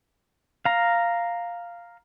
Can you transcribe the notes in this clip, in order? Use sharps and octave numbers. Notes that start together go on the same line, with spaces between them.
F5 A#5